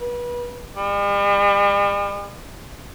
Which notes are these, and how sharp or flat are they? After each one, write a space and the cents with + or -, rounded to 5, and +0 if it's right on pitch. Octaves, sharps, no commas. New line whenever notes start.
B4 -30
G3 +45